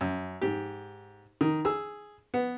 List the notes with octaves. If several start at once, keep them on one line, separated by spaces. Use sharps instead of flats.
F#2
G#2 G4
D#3
G#4 E6
B3